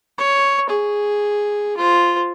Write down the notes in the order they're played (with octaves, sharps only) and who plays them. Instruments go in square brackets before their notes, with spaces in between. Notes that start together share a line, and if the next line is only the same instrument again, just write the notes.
[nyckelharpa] C#5
G#4
F4 C5